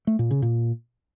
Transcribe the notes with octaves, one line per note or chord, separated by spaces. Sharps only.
A3
A#2
C#3
A#2